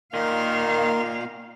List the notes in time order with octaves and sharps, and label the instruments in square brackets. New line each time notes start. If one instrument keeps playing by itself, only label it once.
[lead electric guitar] A#2 [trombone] D#3 [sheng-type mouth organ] A#3 A#4 C6 [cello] F5